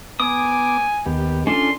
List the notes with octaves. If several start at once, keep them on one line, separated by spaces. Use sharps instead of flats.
B3 G#5 D6 D#6
D#2 B3 G4
C#4 D4 F4 A4 C6